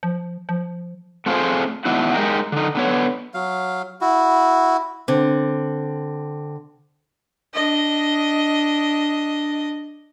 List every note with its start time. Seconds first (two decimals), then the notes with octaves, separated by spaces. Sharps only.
0.03 F3
0.49 F3
1.26 A3 C4 F4 G4 G#4 C5
1.85 G#2 D#3 B3 D4 E4 F#4
2.14 G#3 D#4 G4 A#4
2.52 D3 D#4
2.75 D3 B3 C#5
3.34 F#3 F5
4.01 E4 F#4
5.08 D3 C4
7.54 D4 D#5